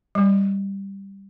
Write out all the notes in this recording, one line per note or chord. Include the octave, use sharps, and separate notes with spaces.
G3